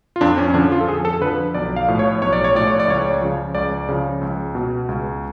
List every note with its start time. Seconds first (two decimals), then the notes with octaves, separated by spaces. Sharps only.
0.16 F4
0.21 F2 D4
0.38 C#4
0.50 C#4
0.54 D3 F3 D4
0.72 F4
0.81 A4
0.88 F2 G#4
1.05 A4
1.21 D3 B4
1.25 F3
1.54 B1 D5
1.76 F5
1.88 A2 F3
1.99 C#5
2.22 B1 C#5
2.33 D5
2.44 C#5
2.55 A2 F3 D5
2.67 C#5
2.80 D5
2.88 C#2 C#5
3.21 C#3 F3
3.55 C#2 D5
3.89 C#3 F3
4.22 C#2
4.55 B2
4.89 C#2